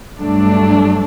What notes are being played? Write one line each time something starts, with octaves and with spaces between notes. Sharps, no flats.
G2 F#3 A3 D4